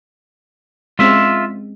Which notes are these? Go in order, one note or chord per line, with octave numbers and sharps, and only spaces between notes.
G#3 C4 C#4 F4 E5